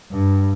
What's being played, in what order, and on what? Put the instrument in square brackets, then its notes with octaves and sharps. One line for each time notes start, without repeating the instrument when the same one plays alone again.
[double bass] G2